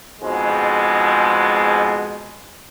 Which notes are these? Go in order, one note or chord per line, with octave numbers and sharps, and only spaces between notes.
F2 G#2 B2 G#3